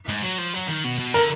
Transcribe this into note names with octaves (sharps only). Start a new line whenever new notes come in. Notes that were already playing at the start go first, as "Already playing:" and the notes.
G#2
F#3
F3
F#3
D#3
B2
B2
D3 A#4